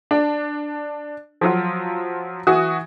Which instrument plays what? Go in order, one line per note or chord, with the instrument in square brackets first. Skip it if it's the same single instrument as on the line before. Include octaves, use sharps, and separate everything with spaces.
[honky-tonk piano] D4
F3 F#3 F4
E3 F#4 D#6